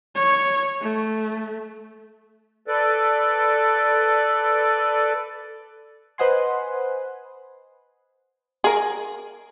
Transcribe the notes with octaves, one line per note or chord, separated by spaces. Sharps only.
C#5
A3
A4 B4 D5
B4 C5 D#5 F#5 G#5 C6
G#4 A#4